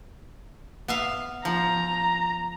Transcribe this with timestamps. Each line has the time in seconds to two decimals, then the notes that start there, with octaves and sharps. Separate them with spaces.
0.88 B3 E5 F5
1.45 F3 A#5